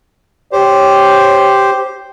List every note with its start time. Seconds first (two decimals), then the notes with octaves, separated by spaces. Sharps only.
0.52 G4 C5 C#5